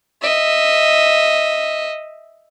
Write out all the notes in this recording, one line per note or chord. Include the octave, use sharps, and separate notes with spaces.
D#5 E5